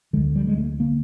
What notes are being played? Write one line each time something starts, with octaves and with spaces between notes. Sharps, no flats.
D2 D3 G#3
G3
G#3
A3
D3 A#3